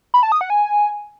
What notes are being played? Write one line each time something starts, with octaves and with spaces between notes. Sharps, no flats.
B5
A5
D#6
F#5
G#5